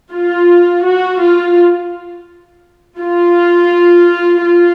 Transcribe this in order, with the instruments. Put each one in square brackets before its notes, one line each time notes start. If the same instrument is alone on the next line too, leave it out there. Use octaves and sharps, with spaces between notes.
[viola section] F4
F#4
F4
F4
F4